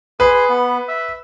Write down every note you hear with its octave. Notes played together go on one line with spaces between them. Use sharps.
G#4 B4 C6
B3
E5